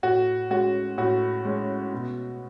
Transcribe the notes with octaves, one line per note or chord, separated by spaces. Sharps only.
A2 F#4
G#3 C#4 F#4
A2 F#4
G#3 C#4
B2